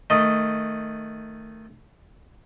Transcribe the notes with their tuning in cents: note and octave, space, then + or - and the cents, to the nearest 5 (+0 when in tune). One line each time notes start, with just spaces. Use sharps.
D#3 +0 A3 +10 D#5 +0